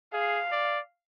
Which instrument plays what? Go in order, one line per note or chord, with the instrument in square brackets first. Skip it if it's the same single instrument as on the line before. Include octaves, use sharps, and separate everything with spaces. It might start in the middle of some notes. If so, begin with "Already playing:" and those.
[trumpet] G#4 [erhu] F5
[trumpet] D5